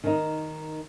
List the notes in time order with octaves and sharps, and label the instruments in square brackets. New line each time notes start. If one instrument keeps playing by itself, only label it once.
[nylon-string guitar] D#3 D#4